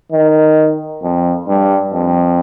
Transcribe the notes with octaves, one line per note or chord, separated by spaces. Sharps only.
D#3
F2
G2
F2